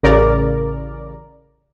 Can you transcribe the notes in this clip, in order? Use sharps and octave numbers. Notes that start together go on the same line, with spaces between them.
A1 C#3 A#4 D5